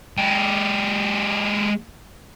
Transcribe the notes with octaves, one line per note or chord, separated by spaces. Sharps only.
G#3 G4